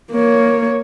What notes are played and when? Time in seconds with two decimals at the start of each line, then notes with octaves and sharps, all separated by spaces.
0.11 A#3 C#5